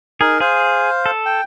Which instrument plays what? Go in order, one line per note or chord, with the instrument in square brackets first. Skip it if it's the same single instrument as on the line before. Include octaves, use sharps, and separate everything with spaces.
[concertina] D#4 A#4 [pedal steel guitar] G#4
[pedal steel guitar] G#4 [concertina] C5 F5
[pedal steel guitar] A4
[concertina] G5